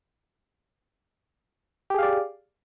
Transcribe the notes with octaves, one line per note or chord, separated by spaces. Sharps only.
G4 G#4 D5 F5